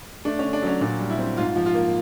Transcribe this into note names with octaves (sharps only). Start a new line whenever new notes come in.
A3 D4
D3 C#4
D4
F#3 C#4
A#2 D4
G3
E4
C4
G#2 F4
F3
F4
A#3